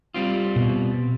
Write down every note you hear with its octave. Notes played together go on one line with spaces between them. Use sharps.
G3 C4 F4
B2